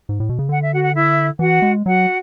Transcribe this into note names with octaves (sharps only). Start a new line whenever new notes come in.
G#2
A2
B2
C#3
D3 F#5
E5
F#4 F#5
F#5
E4 E5
E3 F#4 F#5
G#3
F#3 F#4 F#5